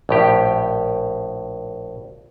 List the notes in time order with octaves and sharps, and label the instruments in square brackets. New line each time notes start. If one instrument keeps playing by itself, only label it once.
[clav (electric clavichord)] A#1 A2 G4